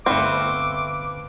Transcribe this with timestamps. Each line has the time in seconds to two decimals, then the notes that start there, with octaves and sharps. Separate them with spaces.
0.06 G1 A3 C4 B4 F5 D6